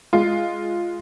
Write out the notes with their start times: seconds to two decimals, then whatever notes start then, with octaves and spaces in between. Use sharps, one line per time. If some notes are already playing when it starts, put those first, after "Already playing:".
0.13 G#3 F4